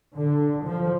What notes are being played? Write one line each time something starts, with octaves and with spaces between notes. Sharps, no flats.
D3
F3